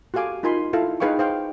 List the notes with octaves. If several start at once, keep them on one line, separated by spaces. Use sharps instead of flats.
F#4 G4 A4 F5 G#5 D6
D#4 F4 A#4 G#5 B5 C6
E4 F4 A4 F5
D#4 G#4 B4 F5 G5 C#6
G#4 C5 F5 G5